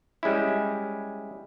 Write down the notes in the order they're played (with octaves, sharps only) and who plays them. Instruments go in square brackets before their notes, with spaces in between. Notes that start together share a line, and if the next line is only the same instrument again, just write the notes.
[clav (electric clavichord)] G3 G#3 C#4 E4